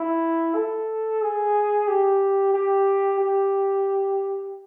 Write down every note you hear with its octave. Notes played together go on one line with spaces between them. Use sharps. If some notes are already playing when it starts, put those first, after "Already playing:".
Already playing: E4
A4
G#4
G4
G4
G4